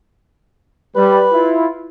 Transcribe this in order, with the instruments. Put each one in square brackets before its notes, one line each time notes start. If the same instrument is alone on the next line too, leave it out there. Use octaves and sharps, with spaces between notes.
[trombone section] G3 [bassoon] B4
[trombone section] E4 F4